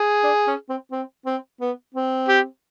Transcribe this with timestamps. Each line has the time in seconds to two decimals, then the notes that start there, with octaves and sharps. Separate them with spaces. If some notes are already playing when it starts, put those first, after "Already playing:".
Already playing: G#4
0.24 D4
0.47 C#4
0.69 C4
0.92 C4
1.26 C4
1.61 B3
1.94 C4
2.29 G4